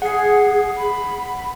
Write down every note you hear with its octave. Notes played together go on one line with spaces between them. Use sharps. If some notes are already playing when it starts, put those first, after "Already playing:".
G#4 F#5 C7
B5